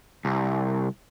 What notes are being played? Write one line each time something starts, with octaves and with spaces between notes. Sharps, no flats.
C2